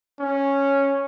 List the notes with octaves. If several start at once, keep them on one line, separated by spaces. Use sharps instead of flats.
C#4